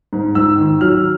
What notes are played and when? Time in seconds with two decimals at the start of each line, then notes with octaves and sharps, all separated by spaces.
0.13 G#2
0.35 G#2 E6
0.58 D#3
0.81 F#3 F6